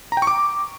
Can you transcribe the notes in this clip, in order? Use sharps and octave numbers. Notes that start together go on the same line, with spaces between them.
A#5
G5
C#6
D6